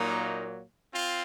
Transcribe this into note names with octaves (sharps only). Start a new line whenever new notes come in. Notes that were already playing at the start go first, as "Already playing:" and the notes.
Already playing: A#2 F#3 A#3 D#4
C4 F4